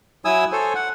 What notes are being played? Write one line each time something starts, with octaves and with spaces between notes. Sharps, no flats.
F#3 E4 G#5 D#6 E6
A4 C5 C#5 G#5
F#5